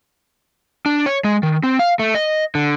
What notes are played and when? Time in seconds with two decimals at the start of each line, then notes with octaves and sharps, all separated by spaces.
0.86 D4
1.06 C#5
1.24 G#3
1.43 D#3
1.63 C4
1.79 F5
1.99 A3
2.15 D#5
2.55 D3